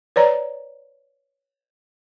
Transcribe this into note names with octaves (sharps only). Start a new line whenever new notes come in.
B4 C#5 D5 A#5